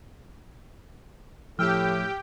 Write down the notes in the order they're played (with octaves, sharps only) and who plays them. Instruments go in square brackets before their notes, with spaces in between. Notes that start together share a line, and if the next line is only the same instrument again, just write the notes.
[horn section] A2 [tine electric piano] F3 [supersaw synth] G4 G5 [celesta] E6 F6